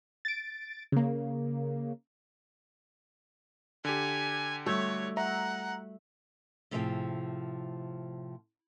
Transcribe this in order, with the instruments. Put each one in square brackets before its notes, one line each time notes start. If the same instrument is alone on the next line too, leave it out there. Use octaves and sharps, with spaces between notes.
[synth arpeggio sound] A6 D7
C#3 A#3
[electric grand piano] D3 G4 [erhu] G#5
[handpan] G3 F#4 [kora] A3 [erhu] C#5
[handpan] E5 [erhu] F#5 [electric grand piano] A#5
[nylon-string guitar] A2 C3 F3 G#4 C#5 G5